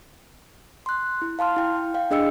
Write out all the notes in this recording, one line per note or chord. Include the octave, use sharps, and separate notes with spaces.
C6 F#6
E4
F5 A5 C6 F6
E4 G5
F5 G5
D4 G#4 D#5 G5 E6 C#7